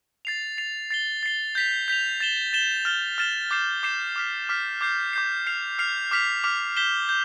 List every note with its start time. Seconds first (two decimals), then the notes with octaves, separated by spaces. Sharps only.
0.25 A6 C7 F7
0.58 A6 C7 F7
0.91 A6 C7 G7
1.23 A6 C7 G7
1.55 G6 B6 F7
1.88 G6 B6 F7
2.20 A6 E7 G7
2.53 A6 E7 G7
2.85 F6 A6 E7 G7
3.18 F6 A6 E7 G7
3.51 D6 G6 C7 E7
3.83 D6 G6 C7 E7
4.16 D6 F6 B6
4.49 D6 F6 B6
4.81 D6 G6 C7
5.13 D6 G6 C7
5.46 F6 C7 F7
5.79 F6 C7 F7
6.11 D6 F6 B6 F7
6.44 D6 F6 B6 F7
6.76 G6 B6 E7 G7
7.09 G6